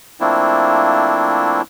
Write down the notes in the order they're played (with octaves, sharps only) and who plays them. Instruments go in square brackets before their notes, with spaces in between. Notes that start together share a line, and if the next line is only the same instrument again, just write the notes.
[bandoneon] F3 A3 A#3 C4 D4 E4